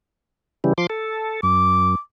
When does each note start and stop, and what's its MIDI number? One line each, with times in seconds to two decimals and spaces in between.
0.64 0.73 49
0.64 0.73 52
0.64 0.73 55
0.78 0.87 53
0.78 0.87 84
0.78 0.87 86
0.90 1.41 69
1.43 1.95 42
1.43 1.98 86